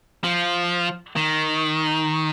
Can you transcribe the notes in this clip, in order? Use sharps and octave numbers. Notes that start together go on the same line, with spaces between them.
F3
D#3